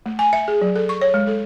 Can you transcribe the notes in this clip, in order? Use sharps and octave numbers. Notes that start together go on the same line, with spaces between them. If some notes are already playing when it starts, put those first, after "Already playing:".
A3
G#5
E5
G#4
F#3
A4
C#6
C#5
G#3
A4